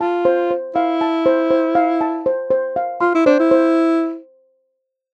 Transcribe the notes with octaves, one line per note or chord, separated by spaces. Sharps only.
F4 A5
C5
C5
E4 F5
A5
C5
C5
F5
A5
C5
C5
F5
F4 C6
E4
D4 C5
E4
C5